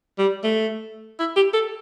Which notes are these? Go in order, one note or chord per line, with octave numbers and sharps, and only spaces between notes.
G3
A3
E4
G4
A4